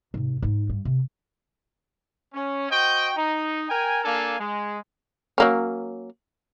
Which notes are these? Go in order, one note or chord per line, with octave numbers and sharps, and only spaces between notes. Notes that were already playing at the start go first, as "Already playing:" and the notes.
G#2 C3
G#2 D#4
G2
C3
C#4
F#4 C5 D#5 G5
D#4
A#4 G5 G#5
A#3 D4 A4 F5 G#5
G#3
F#3 A#3 C#4